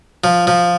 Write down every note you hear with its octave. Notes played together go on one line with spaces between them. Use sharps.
F3
F3